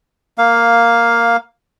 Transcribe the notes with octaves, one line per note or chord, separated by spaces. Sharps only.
A#3 F5